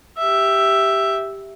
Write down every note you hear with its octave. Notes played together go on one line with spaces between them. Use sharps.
G4 E5